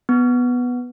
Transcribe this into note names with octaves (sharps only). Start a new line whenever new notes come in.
B3